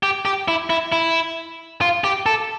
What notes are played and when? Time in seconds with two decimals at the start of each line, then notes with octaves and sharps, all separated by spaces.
0.03 G4
0.25 G4
0.48 E4
0.70 E4
0.92 E4
1.81 F4
2.04 G4
2.26 A4